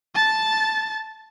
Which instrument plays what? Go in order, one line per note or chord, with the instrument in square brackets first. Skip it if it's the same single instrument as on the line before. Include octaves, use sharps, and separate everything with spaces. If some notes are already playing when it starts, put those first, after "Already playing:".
[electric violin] A5 A6